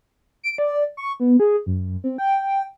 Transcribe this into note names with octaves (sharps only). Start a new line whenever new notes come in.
D7
D5
C#6
B3
G#4
F#2
C4
G5